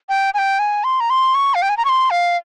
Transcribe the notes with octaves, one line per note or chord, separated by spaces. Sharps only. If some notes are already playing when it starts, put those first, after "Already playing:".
G5
G#5
G5
G#5
C6
A#5
C6
C#6
F5
G5
G#5
A#5
C#6
C6
F5